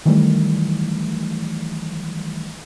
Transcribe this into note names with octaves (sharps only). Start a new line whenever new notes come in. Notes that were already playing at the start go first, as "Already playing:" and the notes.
D#3 E3 F#3 G3 A3